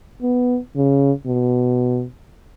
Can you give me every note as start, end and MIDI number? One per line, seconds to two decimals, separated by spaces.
0.22 0.59 59
0.77 1.12 49
1.26 2.05 47